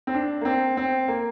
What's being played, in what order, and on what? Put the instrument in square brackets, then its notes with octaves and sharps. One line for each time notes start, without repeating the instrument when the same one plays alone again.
[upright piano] C4
D4
A#3
C4
C4
A#3